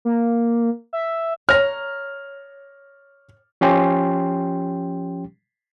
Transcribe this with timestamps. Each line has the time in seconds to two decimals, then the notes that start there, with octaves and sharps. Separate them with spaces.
0.05 A#3
0.93 E5
1.49 C#5 A5 A#5 F6 A#6
3.61 F3 C#4 G4 G5 C6